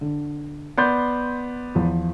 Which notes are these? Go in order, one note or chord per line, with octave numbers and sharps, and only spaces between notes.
D3
B3 D5 C6 G6
E2 F3